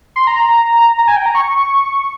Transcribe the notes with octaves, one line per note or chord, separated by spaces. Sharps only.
C6
A#5
A#5
G#5
G5
A#5
C#6